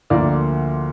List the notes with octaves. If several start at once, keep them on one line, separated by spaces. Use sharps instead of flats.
D2 D3 F3 A#3 A#4 D5